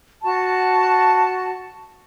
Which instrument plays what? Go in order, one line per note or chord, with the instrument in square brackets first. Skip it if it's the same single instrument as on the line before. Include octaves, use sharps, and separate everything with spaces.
[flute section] F#4 A5